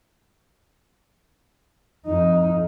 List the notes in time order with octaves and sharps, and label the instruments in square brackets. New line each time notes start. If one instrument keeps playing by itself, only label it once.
[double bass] F2 D#4